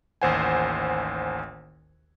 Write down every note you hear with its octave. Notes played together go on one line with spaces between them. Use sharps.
A1 D#2 C5 F#5 G#5